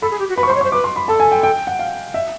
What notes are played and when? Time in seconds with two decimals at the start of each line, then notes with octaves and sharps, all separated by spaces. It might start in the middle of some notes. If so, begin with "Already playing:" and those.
0.02 A4 B5
0.11 G#4
0.19 G4
0.29 F#4
0.37 B4 B5
0.43 C#6
0.46 C5
0.50 C6
0.55 C#5
0.61 C5 C#6
0.72 B4 D6
0.84 C6
0.96 B5
1.08 A4 A5
1.20 G#5
1.32 G5
1.43 G5
1.67 F#5
1.79 F5
2.14 E5